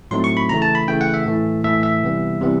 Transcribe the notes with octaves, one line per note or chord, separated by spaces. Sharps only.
A2 F#3 A3 C4 D#4 C6
C#6
B5
C#3 E3 A3 A#5
A5
B5
C#3 E3 A3 G5
F#5
E5
A2 E3 A3
A2 E3 A3 E5
E5
C3 E3 G3 B3
C3 E3 G3 B3